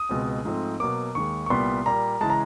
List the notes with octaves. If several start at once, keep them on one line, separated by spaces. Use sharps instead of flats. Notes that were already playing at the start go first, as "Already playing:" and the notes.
Already playing: D#6
C#2 B2 G#3 C4
G#2 F3 A3 C4
B2 F#3 A#3 D6
D#2 D#3 G#3 C#6
C#6
C2 A#2 G3 B3 C6
A#2 G3 A#3 A#5
C#3 E3 G#3 A5
A#5